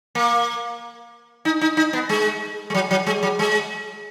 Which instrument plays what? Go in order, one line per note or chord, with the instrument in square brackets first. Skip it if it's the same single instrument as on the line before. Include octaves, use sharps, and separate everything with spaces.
[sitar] A#3
D#4
D#4
D#4
B3
G#3
G#3
F#3
F#3
G#3
F#3
G#3